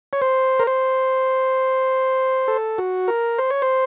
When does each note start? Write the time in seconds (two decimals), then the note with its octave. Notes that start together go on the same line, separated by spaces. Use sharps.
0.13 C#5
0.22 C5
0.60 A#4
0.67 C5
2.48 A4
2.78 F#4
3.08 A#4
3.38 C5
3.50 C#5
3.62 C5